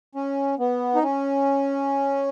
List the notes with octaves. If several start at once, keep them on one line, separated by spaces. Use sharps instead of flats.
C#4
B3
D#4
C#4